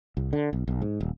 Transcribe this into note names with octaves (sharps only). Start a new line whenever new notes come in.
C2
D3
B1
B1
G#2
D#1